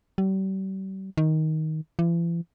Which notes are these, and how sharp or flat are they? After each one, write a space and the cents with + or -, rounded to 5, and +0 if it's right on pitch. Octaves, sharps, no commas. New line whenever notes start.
G3 -40
D#3 +10
E3 +45